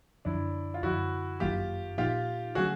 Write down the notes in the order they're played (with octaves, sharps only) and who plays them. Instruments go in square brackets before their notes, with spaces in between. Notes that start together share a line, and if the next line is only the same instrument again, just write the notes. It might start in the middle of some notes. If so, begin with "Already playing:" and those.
[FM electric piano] F#2 D3 F3 [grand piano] D4 E4
[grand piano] F4
[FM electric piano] F#2 D3 F3 [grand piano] E4 F#4
[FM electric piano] G1 F#2 D#3 F#3 A#3 [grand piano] F4 G4
[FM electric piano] A#2 F3 A#3 D#4 [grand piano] F4 G4
[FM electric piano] D3 F#3 A3 C#4 [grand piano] F#4 G#4